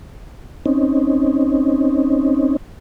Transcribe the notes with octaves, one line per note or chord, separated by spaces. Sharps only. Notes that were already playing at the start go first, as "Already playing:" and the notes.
C4 C#4 D#4